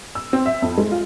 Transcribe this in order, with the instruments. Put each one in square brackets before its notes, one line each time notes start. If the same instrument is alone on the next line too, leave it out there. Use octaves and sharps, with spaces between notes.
[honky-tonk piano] E6
C4
E5
F2
G#3
F4